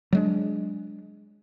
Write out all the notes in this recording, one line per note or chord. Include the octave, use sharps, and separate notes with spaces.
F#3 G#3 D4